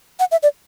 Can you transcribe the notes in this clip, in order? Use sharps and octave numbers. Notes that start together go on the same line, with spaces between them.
F#5
E5
D5